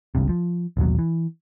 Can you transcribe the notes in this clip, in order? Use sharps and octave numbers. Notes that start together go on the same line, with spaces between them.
G1 C#2 G2 C3
F3
A1 D#2 B2 F#3
E3